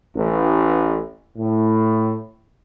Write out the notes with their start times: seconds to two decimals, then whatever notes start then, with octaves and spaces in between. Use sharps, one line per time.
0.15 A1
1.37 A2